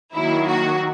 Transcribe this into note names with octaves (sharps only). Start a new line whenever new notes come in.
D#3 F#3 A#3 E4
F#4